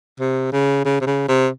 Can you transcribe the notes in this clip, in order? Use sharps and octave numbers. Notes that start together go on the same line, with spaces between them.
C3
C#3
C#3
C3
C#3
C3